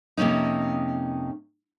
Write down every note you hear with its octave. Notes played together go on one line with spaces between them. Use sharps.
F2 C3 A#3 C#4 D#4